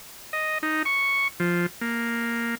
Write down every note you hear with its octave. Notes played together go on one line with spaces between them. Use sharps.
D#5
D#4
C#6
F3
A#3